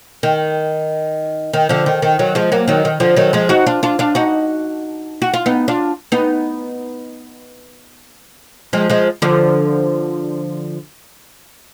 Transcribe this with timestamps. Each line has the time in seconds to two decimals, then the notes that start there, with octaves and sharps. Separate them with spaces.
0.23 D#3
1.53 D#3
1.69 D3 F3
1.86 D#3
2.02 D#3
2.19 D#3 F#3
2.35 F3 G#3
2.52 F#3 A#3
2.68 D#3 F#3
2.85 D#3
3.00 D3 F3
3.16 D#3 F#3
3.33 F3 G#3
3.49 D#4 F#4
3.66 D4 F4
3.83 D4 F4
3.99 D4 F4
4.15 D#4 F#4
5.22 F#4
5.34 F4
5.46 B3 D#4
5.68 D4 F4
6.12 B3 D#4
8.73 F3 G#3
8.90 F3 G#3
9.22 D3 F3